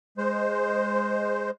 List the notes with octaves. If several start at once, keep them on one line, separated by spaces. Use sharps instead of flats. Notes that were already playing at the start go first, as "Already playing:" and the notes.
G#3 C5